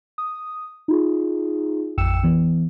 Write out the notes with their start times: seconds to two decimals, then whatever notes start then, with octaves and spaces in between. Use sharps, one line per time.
0.18 D#6
0.88 D#4 F4 G#4
1.98 A1 F2 G5 E6 C#7 E7
2.23 E3 B3